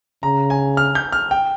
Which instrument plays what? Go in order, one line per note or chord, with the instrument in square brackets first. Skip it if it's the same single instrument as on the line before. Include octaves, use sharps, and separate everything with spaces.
[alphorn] C#3 [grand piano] A#5
[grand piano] G#5
F6
G6
F6
G5